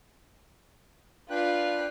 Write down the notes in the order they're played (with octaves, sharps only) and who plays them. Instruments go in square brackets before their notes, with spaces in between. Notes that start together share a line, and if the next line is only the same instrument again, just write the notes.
[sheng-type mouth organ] D4 G5 F#6 [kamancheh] F4 [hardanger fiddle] B4 F5